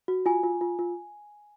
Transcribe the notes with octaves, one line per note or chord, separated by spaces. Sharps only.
F#4
F4 G#5
F4
F4
F4